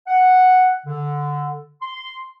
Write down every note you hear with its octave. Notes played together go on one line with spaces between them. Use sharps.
F#5
D3
C6